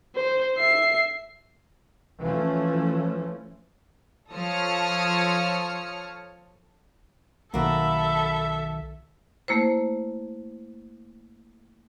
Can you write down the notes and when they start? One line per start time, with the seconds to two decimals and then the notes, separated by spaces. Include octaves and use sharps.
0.15 C5
0.57 E5 C7
2.20 E3 F3 A3 C#4
4.32 F3 A4 C#5 D#6 F6 C#7
7.54 B1 D#3 A#3 F#4 A4 E5 B5
9.48 A3 A#3 E4 C5